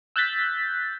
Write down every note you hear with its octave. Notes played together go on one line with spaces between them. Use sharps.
E6 F#6 G6 A6 B6